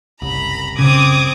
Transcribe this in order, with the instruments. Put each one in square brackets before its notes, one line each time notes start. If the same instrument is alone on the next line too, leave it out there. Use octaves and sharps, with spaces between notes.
[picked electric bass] F#1 C2 [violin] A#5 B5
[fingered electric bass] C#3 [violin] C4 G#6 [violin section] D6 D#6